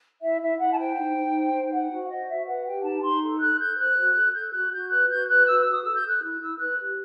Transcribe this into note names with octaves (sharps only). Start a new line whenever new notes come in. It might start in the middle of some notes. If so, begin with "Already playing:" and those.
E4 E5
E4 E5
E4 F#5
A5
C5 G5
D#4
D#4
C5
D#4
C5 F#5
F#4
C5 D#5
F#4 E5
B4 F#5
G4 G5
D#4 A5
D#4 C6
A4
A4 F#6
A4 G6
C5 F#6
F#4
A4
A4 G6
F#4 F#6
F#4 G6
B4 F#6
F#4 G6
B4 F#6
F#4 E6
E6
F#4
D#6
A4 E6
G6
A4
F#6
E4
E4 E6
B4 F#6
G4